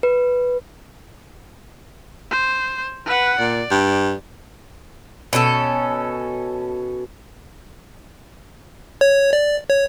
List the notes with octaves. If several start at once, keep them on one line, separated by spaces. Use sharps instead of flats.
B4
C5
B4 F#5
A#2 D5
G2
B2 C#4 G#4 A4
C#5
D5
C#5